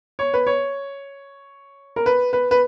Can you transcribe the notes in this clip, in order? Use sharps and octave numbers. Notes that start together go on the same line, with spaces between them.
C#5
B4
C#5
A#4
B4
B4
B4